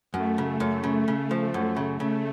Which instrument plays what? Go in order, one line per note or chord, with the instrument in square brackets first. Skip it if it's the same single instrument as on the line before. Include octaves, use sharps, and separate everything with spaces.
[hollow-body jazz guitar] F#2 [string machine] A3
[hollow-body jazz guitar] C#3
F#2
C#3
C#3
F3
F#2
C#3
[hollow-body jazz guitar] C#3 [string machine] A3